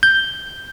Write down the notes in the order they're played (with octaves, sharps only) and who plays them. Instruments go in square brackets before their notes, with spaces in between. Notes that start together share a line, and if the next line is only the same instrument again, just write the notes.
[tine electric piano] G6